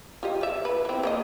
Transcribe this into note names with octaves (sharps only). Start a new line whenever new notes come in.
F4 G4 D#5
F3 E5
B4
E3 C4
A#3 C5 D#5